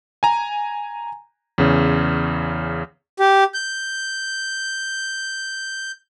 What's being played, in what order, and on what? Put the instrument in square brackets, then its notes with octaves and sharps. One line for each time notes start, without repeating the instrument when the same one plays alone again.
[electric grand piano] G#5 A#5
E2 C#3
[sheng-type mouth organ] G4
G6